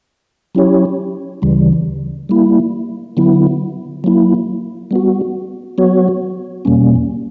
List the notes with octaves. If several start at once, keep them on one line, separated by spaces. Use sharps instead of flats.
F#3 C#4 E4 G4 C#5
D2 C#3 E3 G3
G3 A#3 E4
D3 F#3 B3 E4
F#3 A#3 E4
G3 B3 F#4
F#3 B3 F#4 C#5
E2 B2 G3 A#3 C#4